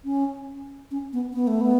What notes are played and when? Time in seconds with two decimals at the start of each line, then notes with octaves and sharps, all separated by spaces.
0.05 C#4
0.91 C#4
1.13 B3
1.34 B3
1.47 A3
1.61 B3